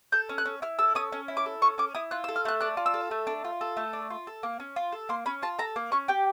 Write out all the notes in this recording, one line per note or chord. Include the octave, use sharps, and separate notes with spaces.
A4 G6
C#4
F#6
C#4
E4 F6
A4 E6
C#4 D#6
C#4
E4
D6
A4
C#4 C#6
C#4 D6
E4 D#6
F4 F#6
E6
A4
F6
A3 F#6
D4 F#6
F4
E6
A4
A3
D4
F4
A4
A3
D4
F4
A4
A#3
C#4
F4
A4
A#3 C6
C#4 B5
F4 A5
A4 A#5
A#3
C#4 C#6
G4 G5